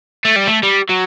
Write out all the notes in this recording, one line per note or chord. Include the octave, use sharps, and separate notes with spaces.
A3
G3
A3
G3
F#3